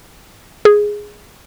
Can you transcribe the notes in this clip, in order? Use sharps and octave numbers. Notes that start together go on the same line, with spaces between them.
G#4